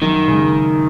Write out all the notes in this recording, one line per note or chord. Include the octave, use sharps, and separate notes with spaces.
F#2 D#3
C#3 G#3